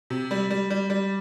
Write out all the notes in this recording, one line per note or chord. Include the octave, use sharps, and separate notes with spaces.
C3
G3
G3
G3
G3